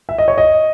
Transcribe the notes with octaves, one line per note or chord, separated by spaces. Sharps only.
E5
D#5
C#5
D#5